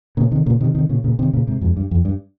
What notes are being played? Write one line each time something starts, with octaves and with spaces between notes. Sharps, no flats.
A#2 C#3
C3 D#3
A#2 C#3
C3 D#3
C3 D#3
A#2 C#3
A#2 C#3
C3 D#3
A#2 C#3
G#2 C3
F2 G#2
G2
F2
G2